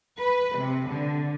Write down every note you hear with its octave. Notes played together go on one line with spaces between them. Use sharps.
B4
C3
D3